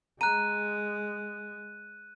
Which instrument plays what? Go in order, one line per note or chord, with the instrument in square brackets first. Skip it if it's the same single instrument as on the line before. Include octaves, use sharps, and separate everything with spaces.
[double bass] G#3 [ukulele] A#5 [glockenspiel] F#6 D#7